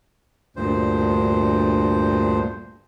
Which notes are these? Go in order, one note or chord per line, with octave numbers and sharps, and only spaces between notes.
D2 G2 A#2 C5